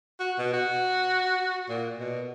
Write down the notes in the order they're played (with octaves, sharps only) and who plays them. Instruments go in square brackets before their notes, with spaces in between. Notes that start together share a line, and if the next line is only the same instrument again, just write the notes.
[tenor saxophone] F#4
B2
F#4
A#2
B2